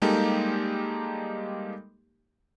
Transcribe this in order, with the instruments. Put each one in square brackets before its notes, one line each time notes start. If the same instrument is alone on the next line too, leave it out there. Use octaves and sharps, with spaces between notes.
[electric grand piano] G3 G#3 A#3 D#4 G4 A4